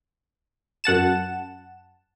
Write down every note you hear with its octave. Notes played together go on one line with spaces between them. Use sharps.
F#2 F#5 A5 E7